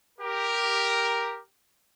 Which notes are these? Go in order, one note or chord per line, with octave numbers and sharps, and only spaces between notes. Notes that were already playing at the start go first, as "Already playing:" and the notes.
G4 A#4